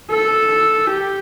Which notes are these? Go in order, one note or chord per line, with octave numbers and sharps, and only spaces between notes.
A4
G4